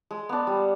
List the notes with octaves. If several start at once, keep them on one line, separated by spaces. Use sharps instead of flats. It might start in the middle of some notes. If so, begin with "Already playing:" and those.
G#3
B3 D4
G3